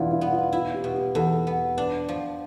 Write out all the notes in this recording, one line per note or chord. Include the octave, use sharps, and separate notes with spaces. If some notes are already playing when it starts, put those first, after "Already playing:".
Already playing: E2 B2 D4 E4 F4
E4
B3
F4
E4 F4
G4
B2
G4
E2 A4
B3
D4 B4
F3